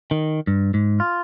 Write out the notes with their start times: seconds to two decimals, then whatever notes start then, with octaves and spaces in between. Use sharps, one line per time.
0.11 D#3
0.47 G2
0.74 G#2
1.00 F4